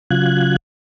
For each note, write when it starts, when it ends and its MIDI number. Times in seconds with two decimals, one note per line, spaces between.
0.11 0.56 49
0.11 0.56 54
0.11 0.56 65
0.11 0.56 90
0.11 0.56 92